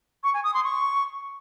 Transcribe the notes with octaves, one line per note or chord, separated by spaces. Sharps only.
C#6
G#5
D#6
C6
C#6